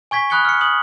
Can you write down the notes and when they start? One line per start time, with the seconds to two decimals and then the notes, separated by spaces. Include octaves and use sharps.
0.11 G#5 C#6 G#6 B6
0.30 B5 D#6 F#6 G#6 C#7 G7
0.45 F6 C#7
0.61 D#6 F#7